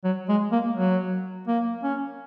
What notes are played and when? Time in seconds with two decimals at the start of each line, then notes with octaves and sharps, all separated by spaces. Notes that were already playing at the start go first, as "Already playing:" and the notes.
0.04 F#3
0.29 G#3
0.52 A#3
0.76 F#3
1.47 A#3
1.83 C#4